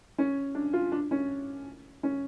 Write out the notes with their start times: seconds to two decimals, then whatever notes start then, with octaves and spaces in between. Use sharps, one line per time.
0.18 C#4
0.55 D4
0.73 F4
0.92 D4
1.11 C#4
2.03 C#4